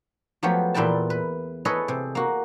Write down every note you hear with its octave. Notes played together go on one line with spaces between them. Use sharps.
F3 F#3 A3 B3 G4
E2 A#2 E4 B4 G5 A5
B4
E4 G#4 A4 B4 C#5 D#5
C3
A#3 F#4